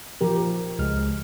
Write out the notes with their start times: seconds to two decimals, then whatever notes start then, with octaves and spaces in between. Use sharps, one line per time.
0.21 F3 G4 A#4
0.79 C#2 G#3 F6